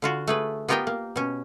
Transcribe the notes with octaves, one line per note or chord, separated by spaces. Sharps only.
D3 F4 F#4
A3 G#4 B4
B3 F4 G4 A#4 D#5 G5
A#3
B2 C#4